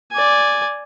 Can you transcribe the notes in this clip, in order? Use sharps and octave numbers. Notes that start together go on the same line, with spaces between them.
D5 G#5